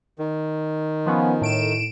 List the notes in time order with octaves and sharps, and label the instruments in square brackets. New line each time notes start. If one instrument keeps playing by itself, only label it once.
[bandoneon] D#3
[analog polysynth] F3 B3 C#4
A2 D7 E7